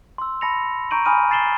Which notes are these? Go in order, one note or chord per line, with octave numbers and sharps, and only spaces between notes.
C6 E6
A5 B5 A#6 C#7 F7
A#5 C#6 G6 D7 D#7 F#7
G#5 B5 D#6 F6 D#7
A6 C7 E7 F#7 G7